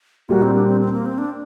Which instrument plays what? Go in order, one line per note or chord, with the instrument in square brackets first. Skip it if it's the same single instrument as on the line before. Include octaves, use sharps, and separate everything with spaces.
[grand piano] A#2 G3 A#3 [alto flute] F#4
[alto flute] C4
D4
C4
C4
A#3
C4
D4